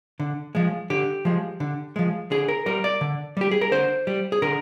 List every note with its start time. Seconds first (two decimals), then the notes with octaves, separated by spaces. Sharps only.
0.20 D3
0.55 F3 G#3
0.90 D3 G4
1.25 F3 G#3
1.60 D3
1.96 F3 G#3
2.31 D3 G#4
2.48 A#4
2.66 G3 A#4
2.84 D5
3.01 D3
3.37 G3 G4
3.51 G#4
3.61 A#4
3.72 D3 C5
4.07 G3
4.32 G#4
4.42 D3 A#4